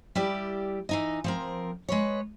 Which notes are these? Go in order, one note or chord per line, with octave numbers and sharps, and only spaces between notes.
G3 E4 G4 D5
E3 D#4 D#5
F3 C4 A#4
G#3 B4 C#5